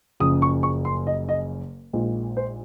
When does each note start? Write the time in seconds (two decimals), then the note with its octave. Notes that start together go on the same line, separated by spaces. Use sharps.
0.20 F#1 F#2 C#3 F3 D#6
0.42 C#6
0.63 C#6
0.85 C6
1.07 D#5
1.29 D#5
1.93 A#1 A#2 G#3 D#4
2.37 C5